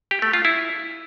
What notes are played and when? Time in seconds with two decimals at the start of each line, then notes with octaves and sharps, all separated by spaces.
0.11 G4
0.22 A3
0.33 F4
0.45 E4